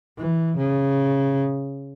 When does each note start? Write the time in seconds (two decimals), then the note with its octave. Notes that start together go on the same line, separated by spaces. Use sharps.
0.18 E3
0.57 C#3